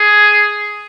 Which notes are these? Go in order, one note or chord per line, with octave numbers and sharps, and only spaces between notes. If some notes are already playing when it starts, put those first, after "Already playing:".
Already playing: G#4